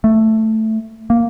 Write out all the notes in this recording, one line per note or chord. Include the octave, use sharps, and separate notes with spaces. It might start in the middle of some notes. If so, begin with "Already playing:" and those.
A3
A#3